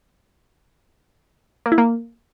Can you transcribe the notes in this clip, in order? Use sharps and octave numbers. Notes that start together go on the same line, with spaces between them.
A#3
E4
A#3